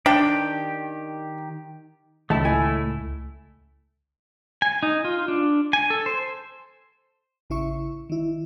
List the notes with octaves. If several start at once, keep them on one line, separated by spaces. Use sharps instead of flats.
D#3 D4 G4 G5
C#2 D#3 A3 E4 A5
A2 G#5
G#5
D#4
F4
D4
G#5
A4
C5
A1 C#3 E4 E5 C#6
D#3 E4